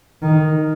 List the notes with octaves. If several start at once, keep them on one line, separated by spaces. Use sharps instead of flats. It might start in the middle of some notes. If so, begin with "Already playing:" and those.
D#3